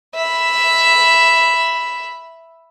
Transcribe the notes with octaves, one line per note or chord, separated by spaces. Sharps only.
E5 B5